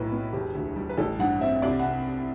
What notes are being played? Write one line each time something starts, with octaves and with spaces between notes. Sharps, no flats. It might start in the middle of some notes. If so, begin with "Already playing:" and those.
Already playing: B1 A2 B4
B3
E1 G4
D2
G3
B4
A1 A4
G2 F#5
C4 E5
C2 D5
F#5
C3